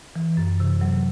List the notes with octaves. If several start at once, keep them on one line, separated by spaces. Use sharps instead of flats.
E3
F#2
C3
F#3